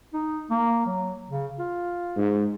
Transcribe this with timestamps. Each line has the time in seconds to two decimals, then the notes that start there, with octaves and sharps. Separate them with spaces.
0.13 D#4
0.50 A#3
0.86 F#3
1.30 C#3
1.59 F4
2.16 G#2